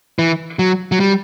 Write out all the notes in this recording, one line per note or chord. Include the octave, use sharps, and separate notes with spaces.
E3
F#3
F#3
G3